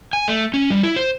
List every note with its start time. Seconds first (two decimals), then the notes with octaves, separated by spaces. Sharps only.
0.13 G#5
0.28 A3
0.54 C#4
0.70 G3
0.83 E4
0.96 C5